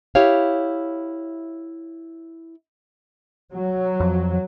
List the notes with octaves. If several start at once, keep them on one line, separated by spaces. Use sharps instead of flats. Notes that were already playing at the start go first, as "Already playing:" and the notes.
E4 G4 C#5 F5
F#3
F2